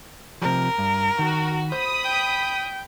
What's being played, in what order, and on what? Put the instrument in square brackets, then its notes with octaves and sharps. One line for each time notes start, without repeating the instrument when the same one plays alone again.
[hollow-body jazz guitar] C3 F3 [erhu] A#4
[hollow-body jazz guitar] G2
[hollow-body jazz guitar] D#3 [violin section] F#4
[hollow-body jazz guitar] C5 [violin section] B5 D#6
[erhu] G5